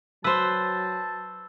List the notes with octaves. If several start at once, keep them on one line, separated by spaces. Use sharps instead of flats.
F#3 B4 C5 A5 E6